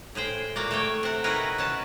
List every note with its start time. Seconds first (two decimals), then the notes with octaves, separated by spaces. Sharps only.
0.15 A2 G#4 C5 G5
0.56 A#2 A#3 F#4 D5
0.71 A3 C#5 G5
1.03 C3 F#5
1.24 D#4 E4 F#4 G#4 A#4 B4
1.58 B2 C#4 F#5 A5